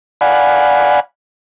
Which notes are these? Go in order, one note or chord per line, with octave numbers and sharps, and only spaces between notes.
D5 F5 F#5 G#5 B5